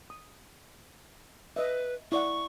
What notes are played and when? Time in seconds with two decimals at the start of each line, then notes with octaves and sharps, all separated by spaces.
0.10 D#6
1.56 B4 D#5 E5
2.12 E4 D5 F#5 C#6